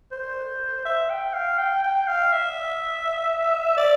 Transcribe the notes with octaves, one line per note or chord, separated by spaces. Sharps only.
C5
E5
G5
F5
G5
G5
F5
E5
D5